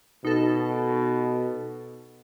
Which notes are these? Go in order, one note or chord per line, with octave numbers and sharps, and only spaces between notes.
B2 D#4 A4